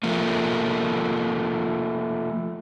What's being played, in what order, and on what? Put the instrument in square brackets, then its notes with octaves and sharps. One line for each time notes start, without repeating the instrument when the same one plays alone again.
[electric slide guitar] F3 A3 A#3